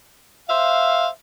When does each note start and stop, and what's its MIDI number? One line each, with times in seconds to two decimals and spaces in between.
0.49 1.07 72
0.49 1.07 76
0.49 1.07 77